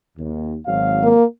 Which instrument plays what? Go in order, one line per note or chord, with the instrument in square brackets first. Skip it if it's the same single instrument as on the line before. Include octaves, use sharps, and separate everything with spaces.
[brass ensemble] D#2
G#1 F#3 F5
[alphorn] A#3